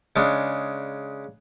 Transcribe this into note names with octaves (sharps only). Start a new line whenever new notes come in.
C#3 G#3 D4